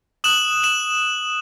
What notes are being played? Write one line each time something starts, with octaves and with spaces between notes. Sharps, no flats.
D#6 F#6 E7 F#7
E7 F#7